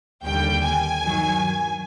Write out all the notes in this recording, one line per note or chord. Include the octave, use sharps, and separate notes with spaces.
D#2 D3 G3 G5
G#5
G2 D#3 F#3